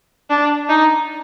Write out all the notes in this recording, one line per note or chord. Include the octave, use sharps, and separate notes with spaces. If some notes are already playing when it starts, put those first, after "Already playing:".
D4
D#4